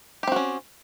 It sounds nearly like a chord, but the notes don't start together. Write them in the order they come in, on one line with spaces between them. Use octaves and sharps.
G4 C4 F#4 C#4